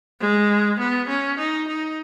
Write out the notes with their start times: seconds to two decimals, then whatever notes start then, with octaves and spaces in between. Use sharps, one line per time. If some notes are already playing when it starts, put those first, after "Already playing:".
0.20 G#3
0.79 B3
1.08 C#4
1.38 D#4
1.67 D#4